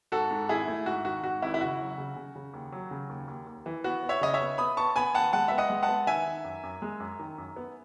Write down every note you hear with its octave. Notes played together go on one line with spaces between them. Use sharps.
G#2 F#4 A4
G#2
G#1 E4 G#4
A3
G#2 F#4
D#3 F#4
G#2 F#4
G#1 E4
E4
C#3 F#4
F#3
C#3
C#3
C#3
D#2
F#3
C#3
D#2
D#2
D#2
E3
B3 F#4
B3
C#5 E5
C#3 D#5
C#5 E5
B3
B3 B5 D#6
B3 A5 C#6
B3 G#5 B5
D#2 F#5 A5
G#3 F#5 A5
B3 E5
D#5 F#5
G#3
F#5 A5
B3
D#3 E5 G#5
D#3
F#2
F#2
G#3
F#2
D#3
F#2
B3